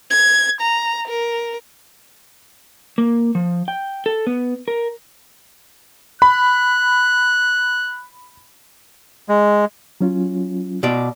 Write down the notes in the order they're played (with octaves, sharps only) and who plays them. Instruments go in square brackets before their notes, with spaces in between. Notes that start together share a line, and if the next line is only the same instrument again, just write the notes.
[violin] G#6
A#5
A#4
[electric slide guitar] A#3
F3
G5
A4
B3
A#4
[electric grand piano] B5 [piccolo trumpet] F#6
[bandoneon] G#3
[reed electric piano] F#3 C#4 F4
[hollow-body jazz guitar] B2 D5